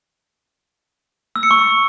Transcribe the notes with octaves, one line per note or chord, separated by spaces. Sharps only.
E6
C#7
C#6